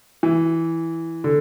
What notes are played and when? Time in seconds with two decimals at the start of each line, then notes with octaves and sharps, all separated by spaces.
0.23 E3
1.24 D3